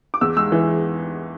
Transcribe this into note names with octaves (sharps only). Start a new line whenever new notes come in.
D6
E2 E6
G#3 E6
E3